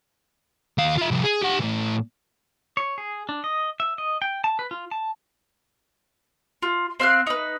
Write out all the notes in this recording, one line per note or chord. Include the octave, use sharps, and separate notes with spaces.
D#2 F5
F4 E5
C2 F3
G#4
G4 F#5
A2 E3
C#5
G#4
D4
D#5
E5
D#5
G5
A5
B4
F4
A5
F4
C4 F5 F6 F#6
D#4 B4